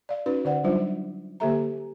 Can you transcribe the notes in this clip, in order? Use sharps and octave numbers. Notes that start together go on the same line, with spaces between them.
D5 F5
C#4 D#4 F#4 B4
D3 D5 F#5
F#3 G3 D4 D#4 F4 C5
D3 A#3 G4 A4 E5 A#5